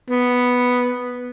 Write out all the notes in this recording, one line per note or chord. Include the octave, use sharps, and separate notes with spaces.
B3